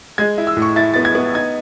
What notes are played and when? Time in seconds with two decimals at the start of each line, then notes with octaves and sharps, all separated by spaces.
0.18 G#3 G#6
0.38 E4
0.47 E6
0.57 A2
0.62 C#6
0.76 E4 A6
0.94 B3 A6
1.05 G#6
1.15 B3
1.34 D#4 G#6